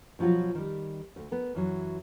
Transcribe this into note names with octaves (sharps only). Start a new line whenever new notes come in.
B2 F3 F#3 F4 F#4
D#3 G3
D2
B3 A#4
F#2 E3 F#3